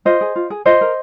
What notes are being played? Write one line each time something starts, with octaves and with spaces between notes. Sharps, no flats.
F4 C5 D#5
G#4
F4
G#4
F4 C5 D#5
A#4